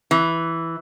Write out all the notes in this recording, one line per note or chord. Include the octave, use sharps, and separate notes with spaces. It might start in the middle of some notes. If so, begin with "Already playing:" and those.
E3